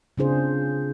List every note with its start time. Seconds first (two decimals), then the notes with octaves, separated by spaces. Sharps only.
0.18 C#3 C4 D4 F4 G#4 C5